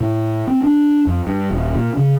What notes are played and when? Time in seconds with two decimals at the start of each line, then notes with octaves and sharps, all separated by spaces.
0.01 A2
0.47 C4
0.64 D4
1.07 F2
1.27 G2
1.51 D#1
1.75 A#2
1.97 C#3